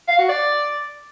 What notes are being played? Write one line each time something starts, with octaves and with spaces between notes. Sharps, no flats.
F5
F#4
D5